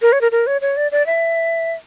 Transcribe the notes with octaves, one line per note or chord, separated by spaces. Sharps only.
A#4
C#5
A#4
A#4
C#5
C#5
D5
D5
E5